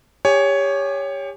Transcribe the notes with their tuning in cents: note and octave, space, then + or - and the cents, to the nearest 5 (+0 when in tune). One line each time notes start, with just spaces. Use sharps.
G4 +30 C#5 +10 G#5 +0